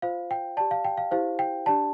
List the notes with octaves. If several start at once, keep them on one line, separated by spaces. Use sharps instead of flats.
F4 C5 F5
G5
G4 D5 A5
F5
G5
F5
E4 G4 C5 F5
G5
D4 G4 D5 A5